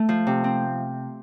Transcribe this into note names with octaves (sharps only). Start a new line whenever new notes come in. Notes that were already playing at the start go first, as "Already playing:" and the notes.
Already playing: A3
F3
C3
C4